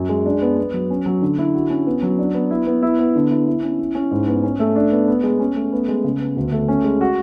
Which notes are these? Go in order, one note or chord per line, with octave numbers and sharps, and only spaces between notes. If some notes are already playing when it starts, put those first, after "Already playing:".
Already playing: F#2
G#3
D4
B3
B3
F#3
C#4
F#3
D3
E4
F#4
C#4
B3
F#3
D4
B3
E4
B3
E4
B3
D3
E4
E4
C#4
E4
C#4
G#2
B3
C#4
A3
D4
B3
B3
G#3
C#4
A3
B3
G#3
C#3
B3
D2
A3
C#4
G#3
F#4